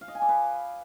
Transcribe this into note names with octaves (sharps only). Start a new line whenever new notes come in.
F5
D#5
G#5
D5
B4